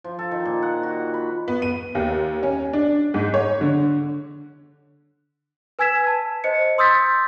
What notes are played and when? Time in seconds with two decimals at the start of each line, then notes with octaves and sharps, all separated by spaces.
0.04 F3
0.19 A4
0.31 D#3
0.45 A#2
0.62 F#5
0.83 F#4
1.14 B5
1.48 B3
1.62 D#7
1.95 D#2
2.43 C#4
2.73 D4
3.14 G#2
3.34 C#5
3.61 D3
5.79 B4 G#5 E6 G#6 B6 E7
6.07 A5
6.44 C5 D#5 C#7
6.78 C6 D#6 E6 G6 A6 B6